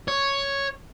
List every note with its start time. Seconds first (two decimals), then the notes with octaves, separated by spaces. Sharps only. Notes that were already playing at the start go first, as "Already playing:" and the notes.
0.08 C#5